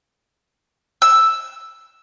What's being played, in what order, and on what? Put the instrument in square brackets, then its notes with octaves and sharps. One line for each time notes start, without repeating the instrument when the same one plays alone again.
[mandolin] E6